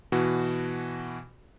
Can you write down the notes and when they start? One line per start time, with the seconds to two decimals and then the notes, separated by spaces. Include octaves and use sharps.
0.12 B2 E3 F#4